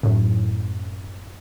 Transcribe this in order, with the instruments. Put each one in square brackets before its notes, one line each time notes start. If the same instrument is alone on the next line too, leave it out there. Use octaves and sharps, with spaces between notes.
[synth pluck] F#2 A2